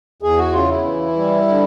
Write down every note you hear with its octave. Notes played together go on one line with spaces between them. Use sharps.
E2 G#4
F#4
C#3 F4
E4
E3
G3
D3